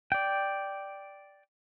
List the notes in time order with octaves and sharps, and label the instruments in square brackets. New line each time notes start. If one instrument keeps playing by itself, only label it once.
[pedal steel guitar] D5 G5